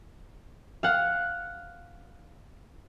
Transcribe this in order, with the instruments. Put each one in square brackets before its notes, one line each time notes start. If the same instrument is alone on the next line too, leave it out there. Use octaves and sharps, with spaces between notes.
[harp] F5 F#5